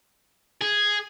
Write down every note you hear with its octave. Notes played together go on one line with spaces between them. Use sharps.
G#4